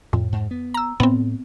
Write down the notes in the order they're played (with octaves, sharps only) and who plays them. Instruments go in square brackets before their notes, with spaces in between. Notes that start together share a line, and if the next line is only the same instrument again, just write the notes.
[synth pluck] F2 [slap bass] A2
[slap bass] G#2
B3
[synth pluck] A#5 E6
[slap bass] A2 [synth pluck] B3 C4